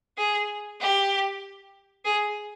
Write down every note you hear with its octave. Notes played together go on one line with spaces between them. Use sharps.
G#4
G4
G#4